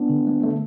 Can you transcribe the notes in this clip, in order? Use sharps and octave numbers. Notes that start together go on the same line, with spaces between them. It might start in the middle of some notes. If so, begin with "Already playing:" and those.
Already playing: B3 D4
D3
A3
A3